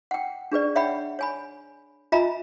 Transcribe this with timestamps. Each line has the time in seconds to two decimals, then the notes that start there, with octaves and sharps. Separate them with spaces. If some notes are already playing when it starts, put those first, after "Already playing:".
0.11 F#5 G5
0.52 D4 G#4 B4 D5
0.75 C#5 E5 F#5 G5 B5
1.19 C#5 G#5 B5
2.12 F4 D#5 E5 G#5 A#5 B5